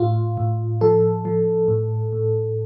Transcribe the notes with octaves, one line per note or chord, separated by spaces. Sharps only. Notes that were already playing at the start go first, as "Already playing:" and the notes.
Already playing: A2 F4
A2
F3 A4
F3
A2
A2